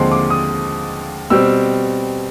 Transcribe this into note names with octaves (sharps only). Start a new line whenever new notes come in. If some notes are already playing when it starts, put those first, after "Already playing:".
Already playing: D#2 D3 F3 G#3 C4 C6
D6
D#6
B2 G3 C4 E6